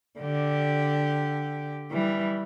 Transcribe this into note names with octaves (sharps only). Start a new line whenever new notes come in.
D3 G4
E3 G3